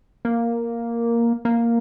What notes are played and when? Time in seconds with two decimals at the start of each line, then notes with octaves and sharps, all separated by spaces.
0.25 A#3
1.45 A#3